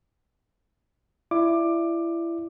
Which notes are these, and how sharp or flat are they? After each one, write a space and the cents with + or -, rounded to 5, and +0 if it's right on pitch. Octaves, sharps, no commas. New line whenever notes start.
E4 +25 D5 +30 D6 +15